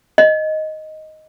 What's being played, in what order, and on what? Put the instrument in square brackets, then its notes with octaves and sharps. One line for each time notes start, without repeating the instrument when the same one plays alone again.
[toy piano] D#5